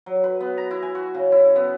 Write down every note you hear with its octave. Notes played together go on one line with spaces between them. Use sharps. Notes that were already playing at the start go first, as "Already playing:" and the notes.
F#3
B4
B3
A#5
E4
G#5
F#4
C#3
E4
B3